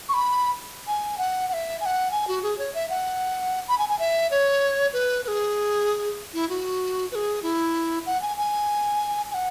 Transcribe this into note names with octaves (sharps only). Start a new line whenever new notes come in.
C#6
B5
G#5
F#5
F#5
E5
G#5
F#5
G#5
F#4
G#4
C#5
E5
F#5
B5
G#5
G#5
E5
C#5
B4
B4
G#4
E4
F#4
B4
G#4
E4
F#5
G#5
G#5
G#5
F#5